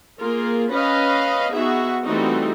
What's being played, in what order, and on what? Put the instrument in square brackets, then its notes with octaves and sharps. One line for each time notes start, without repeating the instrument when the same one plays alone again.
[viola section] A#3 F4 G#4 A#4
C#4 B4 D#5 F5
B3 D#4 F#4 G#4 E5
E3 G3 A3 C4 D#4 F#4